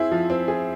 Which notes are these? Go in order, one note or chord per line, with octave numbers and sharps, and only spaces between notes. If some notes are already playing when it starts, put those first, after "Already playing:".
Already playing: C4 E4 G#4
F3
C4
G#4